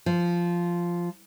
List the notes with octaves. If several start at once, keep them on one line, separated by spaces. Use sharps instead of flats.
F3